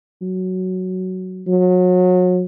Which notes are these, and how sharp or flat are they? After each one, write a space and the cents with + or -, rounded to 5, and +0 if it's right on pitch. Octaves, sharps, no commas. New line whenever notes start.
F#3 +5
F#3 -30